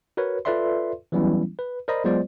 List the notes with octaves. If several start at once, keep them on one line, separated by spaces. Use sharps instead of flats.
F#4 A#4 B4 C#5
F4 A4 B4 D5 E5 C6
E3 F#3 G3 B3 C#4 E4
B4
A#4 C5 D5 D#5 A#5 B5
F#3 G#3 B3 F4 C5 D5